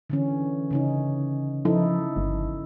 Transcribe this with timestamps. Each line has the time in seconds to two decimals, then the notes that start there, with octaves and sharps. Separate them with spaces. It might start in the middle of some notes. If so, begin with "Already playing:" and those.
0.10 D3 E3 C#4
0.71 C#3 C#4 D#4
1.65 F3 D#4 E4 A4
2.17 G1